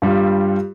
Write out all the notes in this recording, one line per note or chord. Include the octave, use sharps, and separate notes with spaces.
G2 G3 F4